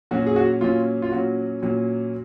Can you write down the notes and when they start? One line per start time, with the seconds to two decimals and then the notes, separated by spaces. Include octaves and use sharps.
0.11 A#2 F#3 C#4 F#4
0.26 G#4
0.36 F#4
0.61 A#2 F#3 C#4 F4
1.02 F4
1.11 A#2 F#3 C#4 F#4
1.62 A#2 F#3 C#4